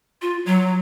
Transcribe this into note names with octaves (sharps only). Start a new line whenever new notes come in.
F4
F#3